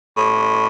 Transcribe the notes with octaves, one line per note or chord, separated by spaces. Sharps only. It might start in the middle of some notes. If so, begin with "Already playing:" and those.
A2